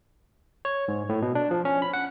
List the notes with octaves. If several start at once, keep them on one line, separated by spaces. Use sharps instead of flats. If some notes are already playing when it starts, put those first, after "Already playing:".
C#5
G#2
A2
B2
D4
F3
C#4
B5
F#5